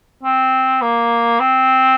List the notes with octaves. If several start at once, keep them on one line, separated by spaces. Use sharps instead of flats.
C4
A#3
C4